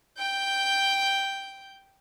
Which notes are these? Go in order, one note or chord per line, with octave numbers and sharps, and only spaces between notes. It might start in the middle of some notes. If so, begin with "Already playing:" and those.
G5 G6